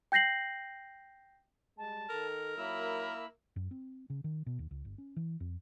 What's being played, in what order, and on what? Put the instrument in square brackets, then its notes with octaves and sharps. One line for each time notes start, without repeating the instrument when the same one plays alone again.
[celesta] G5 G6 A#6 C7 F#7
[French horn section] G3 G#3 [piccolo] A5
[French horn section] D#3 A4 [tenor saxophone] A#4
[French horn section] F#2 A#2 F#3 [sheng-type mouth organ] A#3 E4 E6 [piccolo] B5
[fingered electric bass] F#2
C4
C#3
D#3
B2
D#2
C#2
G1
C#4
E3
F2